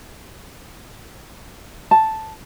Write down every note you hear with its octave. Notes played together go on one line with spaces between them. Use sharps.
A5